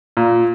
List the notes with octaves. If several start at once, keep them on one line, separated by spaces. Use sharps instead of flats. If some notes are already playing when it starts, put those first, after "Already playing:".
A#2